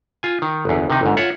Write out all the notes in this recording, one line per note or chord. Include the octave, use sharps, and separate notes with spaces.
F4 G#5
D#3
G1 E2
C3 D#3 D#4
G1 G#2
F4 C#5 E5 F#5